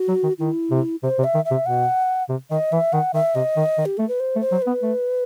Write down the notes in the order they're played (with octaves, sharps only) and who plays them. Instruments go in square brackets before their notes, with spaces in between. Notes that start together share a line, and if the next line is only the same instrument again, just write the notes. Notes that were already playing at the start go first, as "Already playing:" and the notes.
Already playing: [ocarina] F#4
[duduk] F#3
D#3
[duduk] D#3 [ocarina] E4
[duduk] C3
[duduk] C3 [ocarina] C5
[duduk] C3
[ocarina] E5
[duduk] D#3
[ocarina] E5
[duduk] C3
[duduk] B2 [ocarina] F#5
[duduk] C3
[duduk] D#3 [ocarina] D#5
[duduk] E3 [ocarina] E5
[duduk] D#3 [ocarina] F#5
[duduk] D#3 [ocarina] E5
[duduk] C3 [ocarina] D#5
[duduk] D#3
D#3
[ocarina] G4
[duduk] A3 [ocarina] A4
[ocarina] B4
C5
[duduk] A3
[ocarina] C5
[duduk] F#3
[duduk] B3 [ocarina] B4
[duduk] A3